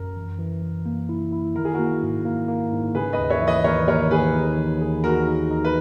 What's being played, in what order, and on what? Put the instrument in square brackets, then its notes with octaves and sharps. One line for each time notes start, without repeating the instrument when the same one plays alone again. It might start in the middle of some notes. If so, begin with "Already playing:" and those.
Already playing: [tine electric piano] F#2 [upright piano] A#4
[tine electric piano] E3
E3
E3
A#3
E4
E4
[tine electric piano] D#3 [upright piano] A#4
[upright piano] G#4
[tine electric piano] A#3 [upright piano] F#4 A#4
[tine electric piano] G#2
A#3
A#3
G#2
[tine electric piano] C#3 [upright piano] G#4 B4
[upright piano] B4 D#5
[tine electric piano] D#2
[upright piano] C#5 E5
[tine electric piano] E3
[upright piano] B4 D#5
[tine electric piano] D#2 [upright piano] A#4 C#5
[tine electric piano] D#2 [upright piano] A#4 C#5
[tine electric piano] D#2 [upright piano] G#4 B4
[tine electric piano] D#4
E3
G#4
[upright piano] F#4 A#4 [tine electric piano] G#4
[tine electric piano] D#4
D#4
[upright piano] B4